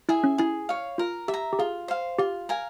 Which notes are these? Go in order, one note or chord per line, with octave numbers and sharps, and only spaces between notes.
E4 G#4 E5 G#5
C#4
E4 G#4
C#5 F5
F4 A#4
G4 E5
A#5
G4
F4 G#4
C5 F5
F4 G4
A#4 F5 G#5